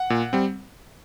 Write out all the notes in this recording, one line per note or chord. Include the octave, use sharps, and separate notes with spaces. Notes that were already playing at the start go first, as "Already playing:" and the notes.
Already playing: F#5
A#2
G3 C4